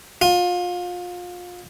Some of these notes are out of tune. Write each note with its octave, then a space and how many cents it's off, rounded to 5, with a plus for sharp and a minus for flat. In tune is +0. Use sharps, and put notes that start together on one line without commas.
F4 +30